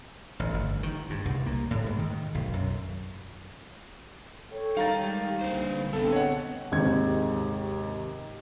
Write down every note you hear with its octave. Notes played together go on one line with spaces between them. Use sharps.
A1
G1
D#3
G2
C2
A#3
A2
G#2
D#3
B1
F#2
A4 C#5 G5
G3 D#4 A#4 F5 A#5 A6
G#3 G4
B1 D3 A#3 B4 C5
D3 B3 C4 A4
C#5 D#5 F#5
D#2 G#2 C3 G#6